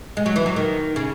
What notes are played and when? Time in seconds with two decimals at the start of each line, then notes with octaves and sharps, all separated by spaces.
0.17 G#3
0.26 F#3
0.36 E3
0.46 F#3
0.56 D#3
0.96 C#3